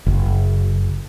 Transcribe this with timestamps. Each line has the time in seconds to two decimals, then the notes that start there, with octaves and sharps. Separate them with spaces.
0.06 F#1